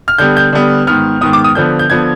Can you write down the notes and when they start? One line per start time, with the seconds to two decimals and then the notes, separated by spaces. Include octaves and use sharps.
0.08 F6
0.18 D3 G3 B3 G6
0.37 G6
0.53 D3 G3 B3
0.87 G#2 D#3 B3 F6
1.21 G#2 D#3 B3 D#6
1.33 D6
1.44 D#6
1.55 D3 F3 B3 G6
1.79 G6
1.90 D3 F3 B3 G#6